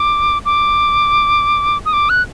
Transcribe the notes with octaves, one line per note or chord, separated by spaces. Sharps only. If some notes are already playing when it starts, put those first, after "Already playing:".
Already playing: D6
D6
D#6
D6
F#6